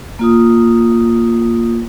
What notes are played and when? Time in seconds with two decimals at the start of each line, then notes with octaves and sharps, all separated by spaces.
0.19 A#3 F4 D#6